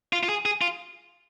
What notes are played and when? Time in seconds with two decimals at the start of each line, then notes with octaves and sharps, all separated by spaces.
0.13 F4
0.23 F4
0.29 G#4
0.46 G#4
0.62 F4